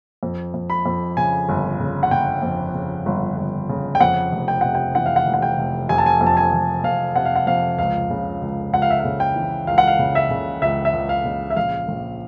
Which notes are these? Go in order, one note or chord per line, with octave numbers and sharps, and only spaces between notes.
F2
F2
B5
F2
C#3 G#5
G1
C#3
F#5
C#3 G5
F2
C#3
G1
G1
C#3
G5
F2 F#5
F1
G5
C3 F#5
G5
E3 F#5
F5
F#5
F1
F#5
G5
F1
F1 G#5
A5
G#5
F2
A5
G#5
F1
F2 F5
C3 F#5
F5
F#5
F2 F5
C#2 F5
C#3
C#2
C#2 F#5
F5
E5
F5
C#3
G5
E3
C#2 F5
F#5
F5
C#3
E5
C#3
C#2 E5
E5
C#2
F5
C#3
E5
A#1 F5
A#1